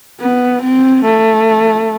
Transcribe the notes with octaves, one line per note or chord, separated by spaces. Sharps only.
B3
C4
A3